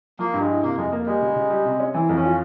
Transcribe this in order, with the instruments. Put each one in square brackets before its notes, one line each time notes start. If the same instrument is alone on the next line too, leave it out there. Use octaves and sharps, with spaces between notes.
[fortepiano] F3 [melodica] A#3
[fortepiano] G2
[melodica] G#3
[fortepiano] E4
[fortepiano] C3 [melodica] A#3
[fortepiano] F2 [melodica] G#3
[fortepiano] A#3
[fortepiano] G3 [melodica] G#3
[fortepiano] C#3
C#3
G3
C3
C#4
[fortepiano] E3 [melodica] C4
[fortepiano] F2
[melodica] C#4
[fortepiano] F4